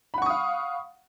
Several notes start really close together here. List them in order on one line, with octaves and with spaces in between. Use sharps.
B5 F#5 C#6 D#6 F5